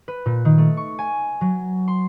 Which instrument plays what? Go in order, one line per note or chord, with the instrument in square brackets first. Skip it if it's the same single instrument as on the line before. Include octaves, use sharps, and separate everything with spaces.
[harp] B4
A#2
D#3
A3
C#6
G#5
F#3
C6